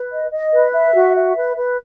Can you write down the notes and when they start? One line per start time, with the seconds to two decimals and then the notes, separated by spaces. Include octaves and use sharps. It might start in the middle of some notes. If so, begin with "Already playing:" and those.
Already playing: B4
0.10 D#5
0.30 D#5
0.53 B4
0.73 E5
0.94 F#4
1.16 E5
1.37 B4
1.57 B4